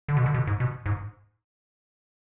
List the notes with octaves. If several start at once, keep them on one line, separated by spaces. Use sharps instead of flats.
D3
B2
D3
B2
G#2
B2
G#2